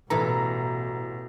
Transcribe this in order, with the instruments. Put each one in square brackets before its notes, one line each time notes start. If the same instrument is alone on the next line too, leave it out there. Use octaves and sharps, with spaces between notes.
[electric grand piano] A1 A#5 [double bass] B2 [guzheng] E3 A4